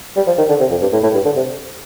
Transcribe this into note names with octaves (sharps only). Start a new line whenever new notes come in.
G3
F3
D#3
D3
C3
F2
G2
A2
A2
G2
D3
C3